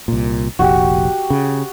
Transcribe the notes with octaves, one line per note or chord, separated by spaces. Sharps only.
C2 A#2
F1 A#1 F#4 G4
C#3